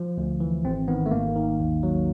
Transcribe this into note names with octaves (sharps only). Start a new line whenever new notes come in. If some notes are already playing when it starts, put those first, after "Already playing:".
Already playing: F3
D2
E3
G#1 C4
D#3 B3
A3
G#1 A#3
D#3
D#2
F#3